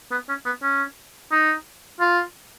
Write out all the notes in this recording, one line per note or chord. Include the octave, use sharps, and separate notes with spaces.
B3
C#4
B3
C#4
D#4
F4